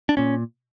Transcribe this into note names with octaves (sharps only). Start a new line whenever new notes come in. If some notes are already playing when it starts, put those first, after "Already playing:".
D4
A#2 C#4